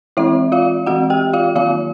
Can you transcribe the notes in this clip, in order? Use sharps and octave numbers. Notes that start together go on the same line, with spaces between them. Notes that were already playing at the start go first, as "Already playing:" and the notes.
E3 G#3 C4 E4 E5
F4 F5
E3 G#3 C4 F#4 F#5
G4 G5
F4 F5
D#3 F#3 A#3 F4 F5